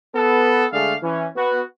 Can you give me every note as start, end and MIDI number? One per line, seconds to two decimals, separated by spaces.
0.15 0.64 59
0.15 0.64 69
0.73 0.94 50
0.73 0.94 56
0.73 0.94 57
0.73 0.94 68
0.73 0.94 74
0.73 0.94 77
1.02 1.27 52
1.02 1.27 61
1.36 1.62 59
1.36 1.62 66